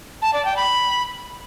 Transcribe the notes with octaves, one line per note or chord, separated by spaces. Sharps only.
A5
D5
G5
B5